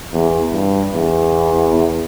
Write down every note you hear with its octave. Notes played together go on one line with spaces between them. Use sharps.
E2
G2
E2